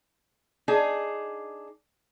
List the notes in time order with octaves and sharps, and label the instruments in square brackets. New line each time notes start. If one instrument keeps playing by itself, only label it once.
[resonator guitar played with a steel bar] D4 D#4 G#4